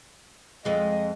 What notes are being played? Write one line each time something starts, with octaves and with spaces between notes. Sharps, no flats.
F2 G#3 D#5